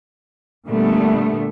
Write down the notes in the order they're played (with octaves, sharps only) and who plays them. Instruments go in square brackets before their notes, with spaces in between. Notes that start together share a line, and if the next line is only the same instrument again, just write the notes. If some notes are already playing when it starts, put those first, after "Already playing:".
[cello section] A#2 D3 G3 A3 B3